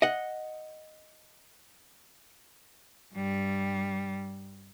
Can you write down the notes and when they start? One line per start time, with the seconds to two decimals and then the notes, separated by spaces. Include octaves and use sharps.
0.02 D#5 F#5
3.14 G2 G3